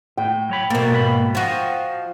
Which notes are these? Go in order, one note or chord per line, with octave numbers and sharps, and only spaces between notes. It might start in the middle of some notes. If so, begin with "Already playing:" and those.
A2 G5
F#3 C#5 B5
B2 A#3 A4 C5
G#2 C5 B5
F3 F#4 C5 D#5